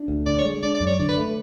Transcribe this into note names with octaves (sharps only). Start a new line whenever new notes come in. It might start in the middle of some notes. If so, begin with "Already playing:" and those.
Already playing: D4
D2
D3 D5
C#5
G#3
D4 D5
D5
F#2
C#5
D3 D5
B4
A3